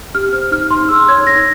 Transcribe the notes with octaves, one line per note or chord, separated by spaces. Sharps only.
G4 F6
C5 F6
D#4 F6
D#4 C6
G#4 E6
C#5 G#6
D#4 A#6